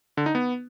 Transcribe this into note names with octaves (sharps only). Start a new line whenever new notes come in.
D3
D#4
B3